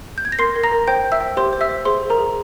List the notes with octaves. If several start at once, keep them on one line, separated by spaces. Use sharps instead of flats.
G6
G#6
A#6
A#4 C6 C7
A#4
A#5 A#6
A#4
C5 G5 G6
C5
E5 E6
G5
G4 C5 C6
C5
E5 E6
C5
G#4 C5 C6
G#4
A#4 A#5
G#4